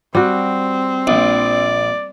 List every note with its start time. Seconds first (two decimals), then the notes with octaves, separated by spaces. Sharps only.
0.15 G3 C4 F#4
1.07 A#1 D5